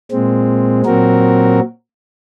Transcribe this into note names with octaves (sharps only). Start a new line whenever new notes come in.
A#2 G#3 C4
A#2 F#3 C4 F#4 A#4